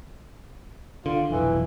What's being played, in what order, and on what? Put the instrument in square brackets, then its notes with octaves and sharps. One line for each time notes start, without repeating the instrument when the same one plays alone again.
[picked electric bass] D3 [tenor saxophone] F4
[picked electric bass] F1 B1 [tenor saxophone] E3